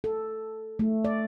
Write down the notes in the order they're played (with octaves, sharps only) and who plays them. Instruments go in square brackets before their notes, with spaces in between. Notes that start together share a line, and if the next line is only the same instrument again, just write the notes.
[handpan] A4
A3
D5